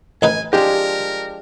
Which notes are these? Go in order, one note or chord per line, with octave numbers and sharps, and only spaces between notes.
A1 D#4 B4 G#5
F3 G#3 D4 G4 A#4